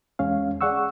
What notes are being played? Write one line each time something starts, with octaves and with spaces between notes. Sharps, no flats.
E2 G#3 C#4 F5
G#4 D5 F#5 C#6 E6